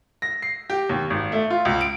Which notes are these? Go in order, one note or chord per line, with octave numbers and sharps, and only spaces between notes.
A#6
C7
G4
D#2
G#1
A3
F4
C#2
D7